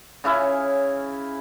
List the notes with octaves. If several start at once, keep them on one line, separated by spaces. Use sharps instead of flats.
C#3 C#4 E4